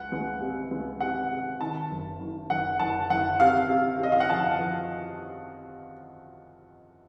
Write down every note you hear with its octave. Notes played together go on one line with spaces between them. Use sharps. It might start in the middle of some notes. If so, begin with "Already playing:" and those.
Already playing: C#2 F#5
C#2
C3
C#2
C3 F#5
C3
D#3 A5
F#1
F#1
F#1 F#5
F#1 A5
F#1 F#5
C3 F5
C3
C3 D#5
F5
F#5
F3 A5
F3